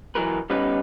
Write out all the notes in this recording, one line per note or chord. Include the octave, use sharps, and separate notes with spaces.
E3 F#3 A#4 B4
G3 B3 C#4 D#4 B4